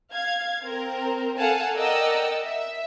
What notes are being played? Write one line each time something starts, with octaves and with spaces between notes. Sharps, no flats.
F5 G#6
C4 A#4
A4 F5 F#5 G#5 A5
A#4 D5 D#5 F#5 G5 E6
E5